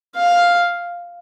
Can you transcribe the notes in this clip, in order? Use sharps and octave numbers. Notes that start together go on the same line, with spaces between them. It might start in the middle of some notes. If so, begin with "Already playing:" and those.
F5